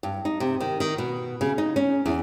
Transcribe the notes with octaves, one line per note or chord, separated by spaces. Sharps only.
G2
D#4
C3
D#3
D#3
B2
C#3
D#4
C#4
E2